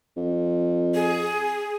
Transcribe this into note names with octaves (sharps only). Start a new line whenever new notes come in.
F2
G#4